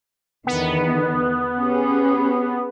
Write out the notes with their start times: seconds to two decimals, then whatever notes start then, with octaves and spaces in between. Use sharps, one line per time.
0.47 E2 D3 D#3 B3
1.56 C#4 G4 G#4